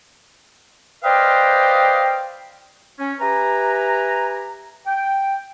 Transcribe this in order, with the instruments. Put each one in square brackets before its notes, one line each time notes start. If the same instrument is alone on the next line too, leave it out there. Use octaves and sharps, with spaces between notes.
[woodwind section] B4 C5 D5 D#5 F5 G5
C#4
G4 B4 E5 G#5 A#5
G5